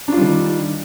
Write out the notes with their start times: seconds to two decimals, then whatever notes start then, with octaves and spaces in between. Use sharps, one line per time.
0.08 D4
0.12 F4
0.17 G3
0.21 D#3